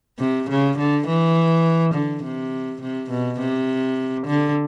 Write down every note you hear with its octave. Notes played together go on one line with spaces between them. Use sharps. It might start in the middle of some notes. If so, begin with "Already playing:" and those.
C3
C#3
D3
E3
D3
C3
C3
B2
C3
D3